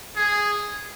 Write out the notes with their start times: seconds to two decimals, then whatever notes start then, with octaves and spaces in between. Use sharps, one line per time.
0.16 G#4